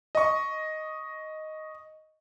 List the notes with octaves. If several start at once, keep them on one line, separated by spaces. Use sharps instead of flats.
D#5 C#6